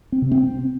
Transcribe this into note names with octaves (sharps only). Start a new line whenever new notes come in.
C4
C3
C4